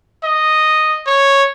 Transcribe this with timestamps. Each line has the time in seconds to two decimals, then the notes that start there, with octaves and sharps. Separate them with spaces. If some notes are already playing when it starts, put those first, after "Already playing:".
0.24 D#5
1.07 C#5